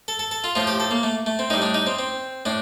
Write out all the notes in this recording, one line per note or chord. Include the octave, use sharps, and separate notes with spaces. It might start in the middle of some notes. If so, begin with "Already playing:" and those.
A4
A4
A4
F4
A2 F3 F4
G4
A4
A#3
A3
A3
C4
A2 G3 D#4
D4
D#4
C4
C4
A2 D4